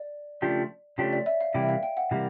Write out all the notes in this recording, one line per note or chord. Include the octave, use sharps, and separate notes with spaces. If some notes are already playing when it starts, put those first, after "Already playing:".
Already playing: D5
C#3 F3 A3 D4 G4
C#3 F3 A3 D4 G4 C#5
D5
E5
F5
C3 E3 G3 A#3 G5
E5
F5
G5
F#5
C3 E3 G3 A#3